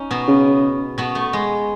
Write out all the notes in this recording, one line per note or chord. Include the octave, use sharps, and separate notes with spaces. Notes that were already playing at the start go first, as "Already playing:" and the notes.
Already playing: C#4 D#4
B2 B3
C#3
B2 B3
A3
G#3